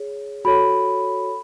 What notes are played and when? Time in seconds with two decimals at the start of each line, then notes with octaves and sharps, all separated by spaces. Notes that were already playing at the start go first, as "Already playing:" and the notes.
Already playing: G#4 C#5
0.45 F#4 A4 C#5 B5